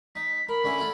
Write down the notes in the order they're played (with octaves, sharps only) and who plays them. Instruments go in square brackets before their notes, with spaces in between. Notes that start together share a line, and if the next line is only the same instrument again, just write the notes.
[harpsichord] D#4 [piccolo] B6
[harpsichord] A#4 [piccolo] B5
[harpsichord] D3 C#4 E4
A3 E4 F4